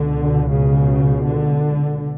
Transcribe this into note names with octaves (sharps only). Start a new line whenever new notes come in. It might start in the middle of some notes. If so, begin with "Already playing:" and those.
Already playing: C#2 B2 D3
C#3
D3